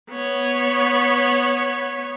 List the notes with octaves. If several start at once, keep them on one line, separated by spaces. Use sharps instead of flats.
B3 C#5